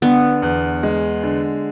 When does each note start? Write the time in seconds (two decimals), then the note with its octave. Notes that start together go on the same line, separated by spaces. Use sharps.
0.02 D3 B3
0.42 E2
0.83 G#3
1.24 D3